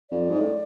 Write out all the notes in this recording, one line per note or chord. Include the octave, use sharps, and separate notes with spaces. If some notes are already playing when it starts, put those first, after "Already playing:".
F2 D5
G#2
A2